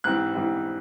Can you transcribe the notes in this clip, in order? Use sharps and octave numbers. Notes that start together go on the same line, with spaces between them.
G#2 E3 G3 C4 F#6
G#2 E3 G3 C4